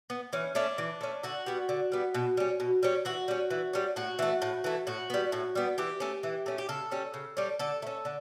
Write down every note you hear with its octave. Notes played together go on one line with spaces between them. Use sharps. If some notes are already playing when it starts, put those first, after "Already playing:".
B3
E3 C#4
A3 C#4 D4
E3
A3 C#4
D3 F#4
G3 B3
D3
G3 B3
B2
G3 C#4
B2
G3 C#4
E3 F#4
G3 C#4
E3
G3 C#4
A2 F#4
E3 A3
A2
E3 A3
A2 F#4
G3 B3
A2
G3 B3
E3 G4
A3 C#4
E3
A3 C#4
G4
C#3 A4
G3 C#4
C#3
G3 C#4
D3 A4
A3
C#4
D3